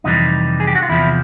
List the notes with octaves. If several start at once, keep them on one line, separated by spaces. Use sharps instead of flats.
F2 C3 E3 G3 D#4
G#4
G4
F#4
F4
E2 C3 F3 E4